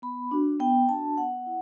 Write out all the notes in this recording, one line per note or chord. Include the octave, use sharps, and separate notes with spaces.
B3 B5
D4 F#4
B3 G5
D4 F#4 A5
B3 F#5
E4